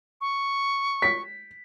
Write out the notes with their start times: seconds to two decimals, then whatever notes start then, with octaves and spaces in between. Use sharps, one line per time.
0.21 C#6
1.02 B6